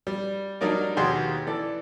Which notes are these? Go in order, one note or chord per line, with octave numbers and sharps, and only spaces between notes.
G3
F#3 G3 D4 D#4 A#4 D5
D#2 B2 G4 G#4 C6
E3 A4 D5